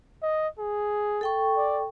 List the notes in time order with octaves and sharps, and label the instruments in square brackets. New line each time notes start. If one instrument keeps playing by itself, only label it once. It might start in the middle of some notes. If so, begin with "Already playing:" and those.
[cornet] D#5
G#4
[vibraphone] A4 G5 C#6
[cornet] D5